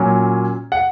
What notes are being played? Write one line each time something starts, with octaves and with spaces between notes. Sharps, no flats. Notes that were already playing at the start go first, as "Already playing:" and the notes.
Already playing: A#2 F#3 C#4 G#5
F#5